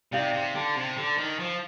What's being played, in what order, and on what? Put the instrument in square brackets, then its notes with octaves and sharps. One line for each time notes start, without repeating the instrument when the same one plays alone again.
[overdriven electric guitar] C3 [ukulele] D#4 G4 D5 F5
[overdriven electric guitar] C3
D3
C3
D3
D#3
F3